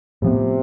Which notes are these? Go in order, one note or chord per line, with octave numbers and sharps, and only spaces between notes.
A2 C3 F3 B3